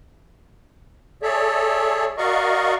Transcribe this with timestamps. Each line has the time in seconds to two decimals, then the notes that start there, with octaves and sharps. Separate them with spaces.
1.22 G#4 A4 C#5 D5 E5
2.17 F#4 A#4 D5 D#5 F5 C#6